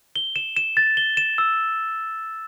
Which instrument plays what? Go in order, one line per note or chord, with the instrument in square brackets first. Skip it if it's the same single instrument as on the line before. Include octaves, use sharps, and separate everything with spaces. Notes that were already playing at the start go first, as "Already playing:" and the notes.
[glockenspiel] G7
E7
E7
A6
G7
E7
E6